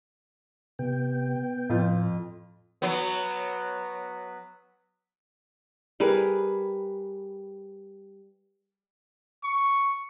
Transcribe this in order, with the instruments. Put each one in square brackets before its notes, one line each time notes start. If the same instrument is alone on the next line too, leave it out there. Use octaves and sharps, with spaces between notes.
[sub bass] C3 [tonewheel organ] B3 G5
[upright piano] F2 F4 [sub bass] A2
[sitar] F#3 B3
[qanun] G3 G#4 A#4 B4
[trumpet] C#6